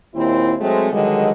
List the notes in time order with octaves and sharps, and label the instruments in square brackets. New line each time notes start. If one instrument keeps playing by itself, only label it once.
[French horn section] D#2 A#2 C4 E4
F#3 G#3 A3 C4
G2 D3 D#3 F#3 G#3